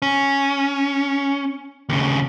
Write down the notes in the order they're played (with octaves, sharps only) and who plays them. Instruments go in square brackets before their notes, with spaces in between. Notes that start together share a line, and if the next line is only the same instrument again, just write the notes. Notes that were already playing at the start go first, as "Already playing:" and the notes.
[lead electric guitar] C#4
D#2 C#3